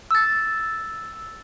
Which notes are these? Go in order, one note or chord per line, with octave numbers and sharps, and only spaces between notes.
E6 A6